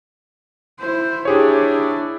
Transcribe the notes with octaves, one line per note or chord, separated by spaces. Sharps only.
E4 C5
D4 E4 G4 G#4 C#5